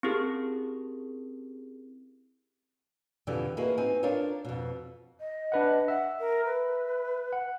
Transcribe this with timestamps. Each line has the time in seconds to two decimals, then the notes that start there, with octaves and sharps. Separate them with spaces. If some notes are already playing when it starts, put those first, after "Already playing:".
0.03 C4 C#4 E4 G4 G#4 A#4
3.27 F2 B2 D3 E3 G4 D5
3.57 A#3 E4 F#4 G#4 B4 D#5
3.78 C4 D#4 G#5
4.03 D4 F4 A#4 C5 C#5
4.45 F2 B2
5.20 D#5
5.52 D4 B4 F#5
5.88 E5 F#5
6.20 A#4
6.45 B4
7.33 F#5